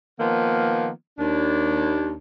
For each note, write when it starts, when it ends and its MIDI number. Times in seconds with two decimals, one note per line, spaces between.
0.19 0.89 51
0.19 0.89 53
0.19 0.89 58
0.19 0.89 59
1.18 2.14 39
1.18 2.14 62